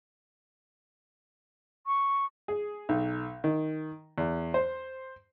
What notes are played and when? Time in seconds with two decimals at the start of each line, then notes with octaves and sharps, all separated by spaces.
1.87 C#6
2.48 G#4
2.89 B1
3.44 D#3
4.18 E2
4.54 C5